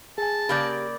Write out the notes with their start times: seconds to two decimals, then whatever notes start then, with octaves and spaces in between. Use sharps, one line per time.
0.18 G#4 G#5 A5
0.49 C#3 A#3 G4 D5 B5 G6 A6